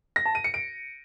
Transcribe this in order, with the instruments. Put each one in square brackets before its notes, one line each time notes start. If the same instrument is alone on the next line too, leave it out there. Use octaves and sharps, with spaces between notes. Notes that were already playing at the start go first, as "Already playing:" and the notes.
[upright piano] A#6
A5
D#7
C#7
D7